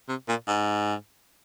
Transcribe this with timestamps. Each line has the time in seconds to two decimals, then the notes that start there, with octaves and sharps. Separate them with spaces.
0.09 C3
0.28 A#2
0.48 G#2